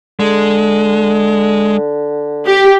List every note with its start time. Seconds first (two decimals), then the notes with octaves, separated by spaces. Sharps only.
0.20 D3 G#3
2.47 G4